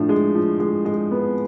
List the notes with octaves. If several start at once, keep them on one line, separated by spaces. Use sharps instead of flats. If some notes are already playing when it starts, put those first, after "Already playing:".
Already playing: A2 F3 D4
G#3
F3
G#3
G#3
B3 C#4
C4